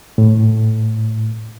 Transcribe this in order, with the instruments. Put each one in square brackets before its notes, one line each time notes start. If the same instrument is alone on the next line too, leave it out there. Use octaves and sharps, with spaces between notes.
[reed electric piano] A2